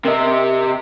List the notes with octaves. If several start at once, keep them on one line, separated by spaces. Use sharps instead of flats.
C3 A#4 D#5